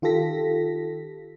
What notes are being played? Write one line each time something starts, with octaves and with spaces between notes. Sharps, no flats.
D#3 F4 G4 A4 A#6 B6